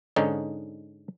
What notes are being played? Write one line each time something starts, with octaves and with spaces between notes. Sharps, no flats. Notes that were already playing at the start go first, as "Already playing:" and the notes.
G#2 D3 C#4 D#4